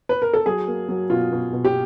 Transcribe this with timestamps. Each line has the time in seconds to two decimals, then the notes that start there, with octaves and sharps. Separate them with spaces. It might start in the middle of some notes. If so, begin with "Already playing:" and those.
0.09 B4
0.22 A#4
0.33 A4
0.46 F#3 G#4
0.67 A#3
0.89 F#3
1.10 B2 F4
1.32 B2
1.53 B2
1.65 G4